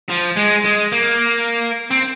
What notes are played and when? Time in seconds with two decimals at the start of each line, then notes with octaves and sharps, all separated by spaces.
0.09 F3
0.36 G#3
0.64 G#3
0.92 A#3
1.91 C4